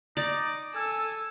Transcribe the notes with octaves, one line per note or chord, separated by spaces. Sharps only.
D#4 D5
A4 G#5 E6